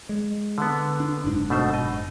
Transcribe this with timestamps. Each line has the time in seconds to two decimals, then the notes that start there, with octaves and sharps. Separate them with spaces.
0.09 G#3
0.58 D3 B3
1.00 D4
1.25 F#1 G#2 D4
1.50 B2 A3 C5
1.74 D#5